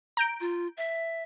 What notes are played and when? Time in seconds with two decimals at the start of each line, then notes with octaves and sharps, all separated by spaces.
0.17 A#5 G6 D7
0.40 F4
0.77 E5